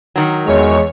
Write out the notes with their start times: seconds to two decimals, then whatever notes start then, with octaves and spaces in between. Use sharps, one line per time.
0.16 D#3 F#3
0.46 E2 G#3 C#5